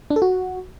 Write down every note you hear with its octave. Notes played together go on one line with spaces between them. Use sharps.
D4
A4
F#4